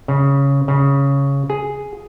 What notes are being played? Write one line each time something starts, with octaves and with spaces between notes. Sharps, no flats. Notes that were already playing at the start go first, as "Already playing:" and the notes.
C#3
C#3
G#4